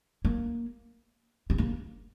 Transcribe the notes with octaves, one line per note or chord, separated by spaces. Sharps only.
A#3
C4
A#3